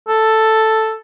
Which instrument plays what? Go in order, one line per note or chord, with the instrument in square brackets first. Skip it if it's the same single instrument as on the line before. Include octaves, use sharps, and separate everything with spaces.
[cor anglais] A4